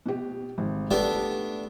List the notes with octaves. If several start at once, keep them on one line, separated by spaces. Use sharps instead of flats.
B2 G4
G#1
A3 B3 D4 G4